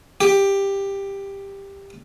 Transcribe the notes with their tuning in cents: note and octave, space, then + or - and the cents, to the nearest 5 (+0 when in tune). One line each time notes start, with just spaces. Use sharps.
G4 +10